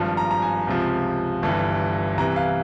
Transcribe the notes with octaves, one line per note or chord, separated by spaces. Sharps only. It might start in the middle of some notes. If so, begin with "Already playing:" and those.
Already playing: G#1 G2 F3
A#5
A#5
G#5
C#2 C3 F3
G1 G2 E3
C2 C3 E3 A#5
F5